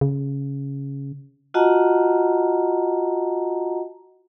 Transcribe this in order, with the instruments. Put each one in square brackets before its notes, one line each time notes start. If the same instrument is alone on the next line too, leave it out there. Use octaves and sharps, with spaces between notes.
[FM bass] C#3
[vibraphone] F4 F#4 D#5 F#5 A5 A#5